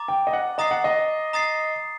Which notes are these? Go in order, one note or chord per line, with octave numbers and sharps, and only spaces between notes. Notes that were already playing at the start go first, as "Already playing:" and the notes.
Already playing: A#5 D6 A6
G5
D#5
F#5
D#5 A#5 D#6 A6 C7
F#5
D#5
A#5 D#6 A6 C7